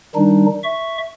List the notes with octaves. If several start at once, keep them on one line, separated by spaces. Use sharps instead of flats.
D#3 G3 D4 D#4
E5 C#6